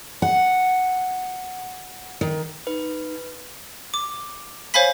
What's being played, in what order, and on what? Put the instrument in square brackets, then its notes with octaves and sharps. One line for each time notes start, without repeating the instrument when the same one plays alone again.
[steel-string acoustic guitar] F#5
D#3
[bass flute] D#4 [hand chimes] B4
[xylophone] D6
C5 C#5 F5 G#5 B5 B6